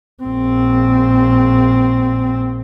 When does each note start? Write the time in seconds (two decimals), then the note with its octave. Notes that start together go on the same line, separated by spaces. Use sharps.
0.23 A#1 C4